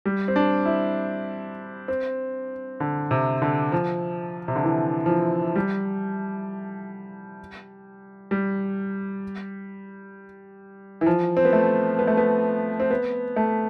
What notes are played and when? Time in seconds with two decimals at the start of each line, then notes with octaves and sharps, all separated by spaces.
0.06 G3
0.28 C4
0.36 D4
0.66 E4
1.88 C4
2.80 D3
3.11 C3
3.42 D3
3.72 F3
4.48 C3
4.56 D3
4.64 E3
5.06 F3
5.10 E3
5.55 G3
8.31 G3
11.01 E3
11.06 F3
11.37 C4
11.45 B3
11.53 A3
11.99 B3
12.07 A3
12.17 B3
12.80 C4
12.91 B3
13.36 A3